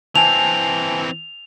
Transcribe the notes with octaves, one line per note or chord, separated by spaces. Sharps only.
E3 C4 G#5 A5 F7